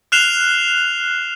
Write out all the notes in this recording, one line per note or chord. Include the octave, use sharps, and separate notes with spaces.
F6 F#6 C7 E7 F7 G7